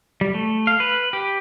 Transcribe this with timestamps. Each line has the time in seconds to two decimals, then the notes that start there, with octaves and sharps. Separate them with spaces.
0.21 G3
0.34 A3
0.67 F5
0.80 B4
1.13 G4